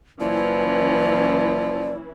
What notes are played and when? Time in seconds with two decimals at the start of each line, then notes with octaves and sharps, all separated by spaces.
0.20 F#1 E3 F3 C#4 E4 D5